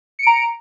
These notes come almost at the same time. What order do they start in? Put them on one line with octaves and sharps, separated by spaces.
C#7 D7 A#5